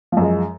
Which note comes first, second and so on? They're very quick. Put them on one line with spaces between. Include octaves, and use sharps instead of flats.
F3 F#2 G#3